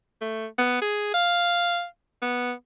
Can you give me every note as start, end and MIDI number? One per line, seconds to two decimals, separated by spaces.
0.21 0.47 57
0.58 0.80 59
0.82 1.12 68
1.14 1.85 77
2.22 2.52 59